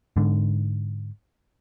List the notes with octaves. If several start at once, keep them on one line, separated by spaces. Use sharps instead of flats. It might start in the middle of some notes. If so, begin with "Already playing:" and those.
G#2 D3